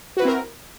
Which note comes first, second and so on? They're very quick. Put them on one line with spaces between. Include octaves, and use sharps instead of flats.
F#4 B4 E4 C4 A#4